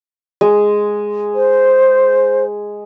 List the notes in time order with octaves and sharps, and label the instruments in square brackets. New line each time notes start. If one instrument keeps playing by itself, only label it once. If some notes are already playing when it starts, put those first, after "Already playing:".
[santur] G#3
[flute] C5